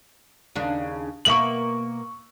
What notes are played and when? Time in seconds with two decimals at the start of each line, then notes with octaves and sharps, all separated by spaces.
0.55 D#2 C#3 D4
1.25 B2 A#3 E5 C#6 F#7